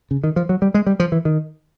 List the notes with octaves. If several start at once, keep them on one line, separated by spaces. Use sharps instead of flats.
C#3
D#3
F3
F#3
G3
G#3
G3
F3
E3
D#3